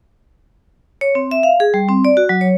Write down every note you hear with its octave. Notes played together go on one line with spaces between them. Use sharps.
C#5
C4
E5
F5
G#4
G3
C4
D5
F#4
F#3
C#5